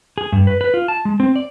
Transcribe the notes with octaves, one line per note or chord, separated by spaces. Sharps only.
G#4
G2
B4
B4
F4
A5
G#3
C4
D5